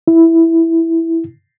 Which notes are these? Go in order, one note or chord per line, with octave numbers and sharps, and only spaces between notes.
E4